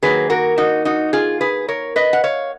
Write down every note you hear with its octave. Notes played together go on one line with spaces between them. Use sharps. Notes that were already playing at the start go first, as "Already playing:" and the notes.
D#3 F#3 A#3 G#4 B4
F#4 A#4
D#4 F#4
D#4 F#4
F4 G#4
G#4 B4
A#4 C#5
B4 D#5
F#5
C#5 F5